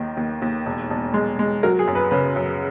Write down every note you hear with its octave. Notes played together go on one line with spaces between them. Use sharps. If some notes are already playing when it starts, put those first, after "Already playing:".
Already playing: D#2 D#3
D#2
D#2
E1
E1
G#3
G#3
F#3 A#4
G#4
F#2
B4
C#3 B4
F#2